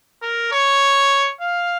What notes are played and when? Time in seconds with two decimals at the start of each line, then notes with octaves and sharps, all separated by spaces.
0.22 A#4
0.52 C#5
1.41 F5